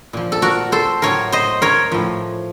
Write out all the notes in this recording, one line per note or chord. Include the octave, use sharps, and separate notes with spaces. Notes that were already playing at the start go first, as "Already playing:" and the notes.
A#2 F3
A4
F#4 A#4
A4 C5
A2 F#3 A#4 C#5
C5 D#5
A#4 C#5
A2 F3